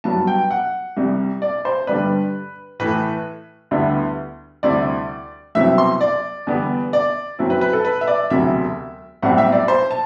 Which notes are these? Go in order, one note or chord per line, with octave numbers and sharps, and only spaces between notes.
G2 F#3 B3 A5
G5
F#5
C2 C3 G3
D5
C5
G2 D3 G3 D4 B4
A2 E3 A3 B4
D2 D3 G3 B3 E4
D2 C3 G3 C4 E4 D5
C2 B2 F#3 C4 E4 E5
C6
D5
E2 D3 G3 B3 D4
D5
F#2 F#3 C4 E4
B4
B4
A4
B4
E5
D5
E1 D2 C3 F#3 E5
B1 A2 G3 C4 E4 F#5
E5
D5
C5
A5